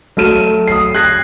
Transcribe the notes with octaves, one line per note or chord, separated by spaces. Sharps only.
F#3 A3 F6 D#7 E7
D#6 C7
F#6 G#6 A#6 C7